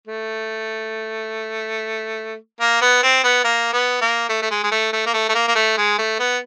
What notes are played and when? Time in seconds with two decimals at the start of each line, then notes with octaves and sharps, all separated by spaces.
0.07 A3
2.60 A#3
2.81 B3
3.03 C4
3.24 B3
3.44 A#3
3.72 B3
4.01 A#3
4.29 A3
4.42 A3
4.51 G#3
4.63 G#3
4.71 A3
4.93 A3
5.06 A#3
5.14 A3
5.29 A3
5.35 A#3
5.48 A#3
5.55 A3
5.77 G#3
5.98 A3
6.19 B3